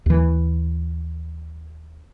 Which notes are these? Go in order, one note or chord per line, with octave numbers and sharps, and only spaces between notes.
D#2 E3